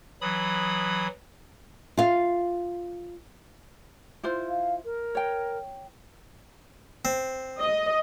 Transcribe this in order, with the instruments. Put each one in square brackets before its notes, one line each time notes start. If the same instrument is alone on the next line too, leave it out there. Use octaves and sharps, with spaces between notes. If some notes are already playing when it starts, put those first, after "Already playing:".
[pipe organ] E3 F#3 B5 D#6
[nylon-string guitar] F4 F5
[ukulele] E4 F4 C5
[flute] F5
A#4
[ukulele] C#5 G5
[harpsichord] C4
[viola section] D#5